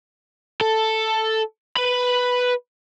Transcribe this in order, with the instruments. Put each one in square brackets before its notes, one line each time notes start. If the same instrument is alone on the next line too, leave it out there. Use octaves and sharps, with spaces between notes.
[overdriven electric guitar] A4
B4 B5